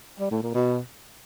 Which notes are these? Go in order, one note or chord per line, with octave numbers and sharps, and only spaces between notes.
G3
A2
A#2
B2